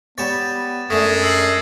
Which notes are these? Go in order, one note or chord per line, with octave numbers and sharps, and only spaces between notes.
G3 B3 G4 C#5 A6 E7
F#2 G#3 A3 D4 D#6 B6 E7
E6 C7 F#7